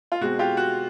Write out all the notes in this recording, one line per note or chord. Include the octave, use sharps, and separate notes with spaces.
F4
B2 G#3 C4 F#4
F4 G4
F#4